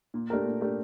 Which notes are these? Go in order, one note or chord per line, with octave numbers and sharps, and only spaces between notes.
A#2
A3 D4 G4 A#4
A#2
A3 D4 G4 A#4